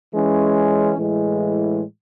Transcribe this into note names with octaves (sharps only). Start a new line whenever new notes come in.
E3 G#3 C#4
A2 E3 G#3